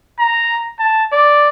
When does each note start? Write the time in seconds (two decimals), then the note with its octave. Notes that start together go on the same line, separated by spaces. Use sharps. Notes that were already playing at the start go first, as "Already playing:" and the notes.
0.19 A#5
0.79 A5
1.13 D5